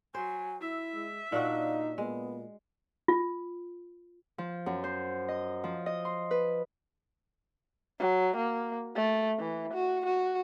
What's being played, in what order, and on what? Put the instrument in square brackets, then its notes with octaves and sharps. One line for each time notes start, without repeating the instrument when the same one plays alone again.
[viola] F#3 [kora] C5 [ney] G#5
[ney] E4 [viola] E5
[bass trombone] G#3
[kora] A#2 D4 F#4 [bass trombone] D#4 [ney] F5
[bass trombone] A#2 [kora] G#3 [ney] B3
[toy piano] F4
[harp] F3
F#2
C5
D#5
F3
D#5
C6
B4
[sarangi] F#3
A#3
A3
E3
F#4
F#4